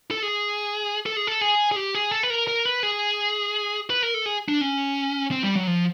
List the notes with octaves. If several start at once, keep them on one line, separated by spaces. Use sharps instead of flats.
A4
G#4
A4
G#4
A4
G#4
G#4
G4
G#4
A4
B4
A#4
A#4
B4
G#4
B4
A#4
A4
G#4
D4
C#4
C4
G3
F#3
F3